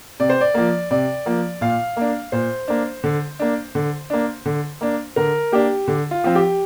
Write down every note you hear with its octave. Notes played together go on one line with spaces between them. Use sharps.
C3 D5
C5
D5
F3 A#3
C3 D5
F3 A#3
A#2 F5
A#3 D4
A#2 C5
A#3 D4
D3
A#3 D4
D3
A#3 D4
D3
A#3 D4
D3 A#4
A#3 D4 G4
D3
F4
F3 C4
G4